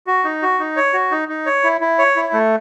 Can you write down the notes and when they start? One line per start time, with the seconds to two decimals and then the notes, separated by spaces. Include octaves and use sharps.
0.07 F#4
0.24 D#4
0.42 F#4
0.60 D#4
0.76 C#5
0.93 F#4
1.11 D#4
1.29 D#4
1.46 C#5
1.64 E4
1.81 E4
1.99 C#5
2.16 E4
2.33 A3